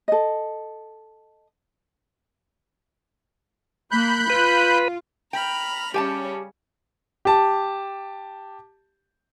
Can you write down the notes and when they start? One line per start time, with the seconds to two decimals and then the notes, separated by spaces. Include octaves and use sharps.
0.08 A4 D#5
3.91 A#3 B5 F#6 G6
4.30 F4 B4
5.33 G5 A#5 B5 F6
5.94 C#3 G3 C#4 G4 G#5 A5
7.25 G4 A5